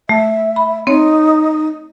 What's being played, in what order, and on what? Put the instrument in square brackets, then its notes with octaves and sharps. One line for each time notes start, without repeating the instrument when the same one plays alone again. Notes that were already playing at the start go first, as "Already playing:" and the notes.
[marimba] A3 [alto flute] E5
[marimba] B5
[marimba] C4 C#5 [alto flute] D#4